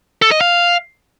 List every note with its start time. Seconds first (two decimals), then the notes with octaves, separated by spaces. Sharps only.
0.22 A4
0.31 D#5
0.41 F5